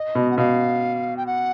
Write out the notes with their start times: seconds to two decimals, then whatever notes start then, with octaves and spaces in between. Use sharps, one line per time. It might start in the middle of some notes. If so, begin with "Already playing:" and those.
Already playing: D#5
0.15 B2
0.31 F#5
0.38 B2 F5
1.17 G5
1.27 F#5